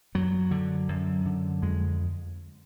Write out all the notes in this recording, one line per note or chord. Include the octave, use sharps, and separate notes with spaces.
F#2 F#3
D3
F#2
D3
F2 G#3